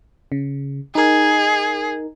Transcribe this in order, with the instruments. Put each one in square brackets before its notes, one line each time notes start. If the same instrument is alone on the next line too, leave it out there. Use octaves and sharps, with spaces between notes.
[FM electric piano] C#3
[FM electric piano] D#4 A#4 [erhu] G#4